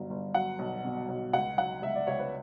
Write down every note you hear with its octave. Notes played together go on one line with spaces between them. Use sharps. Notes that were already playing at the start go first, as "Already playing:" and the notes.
Already playing: G1 F#3
G1
F#3 F#5
B1
B2
B1
C#2 F#5
F#3 F#5
C#2 E5
D5
C#2 C#5
B4